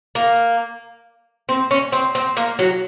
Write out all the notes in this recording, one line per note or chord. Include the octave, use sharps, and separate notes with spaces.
A#3
C4
C#4
C4
C4
A#3
F#3